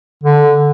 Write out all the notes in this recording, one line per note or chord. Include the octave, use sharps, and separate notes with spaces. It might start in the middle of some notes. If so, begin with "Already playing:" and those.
D3